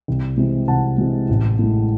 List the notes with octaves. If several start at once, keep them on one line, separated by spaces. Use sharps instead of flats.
C2
C3 E3 G#3
C2 F#5 A5
C3 E3 G#3
A1
A2 G#3